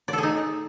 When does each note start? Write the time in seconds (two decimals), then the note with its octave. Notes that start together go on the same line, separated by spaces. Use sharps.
0.08 D5
0.13 A4
0.18 G#4
0.23 D#4